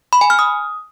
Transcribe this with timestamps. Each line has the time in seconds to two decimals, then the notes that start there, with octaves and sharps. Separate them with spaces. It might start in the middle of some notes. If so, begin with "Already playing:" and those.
0.13 B5
0.21 G#5
0.30 F6
0.39 D#6